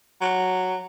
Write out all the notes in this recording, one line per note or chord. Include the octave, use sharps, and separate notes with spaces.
F#3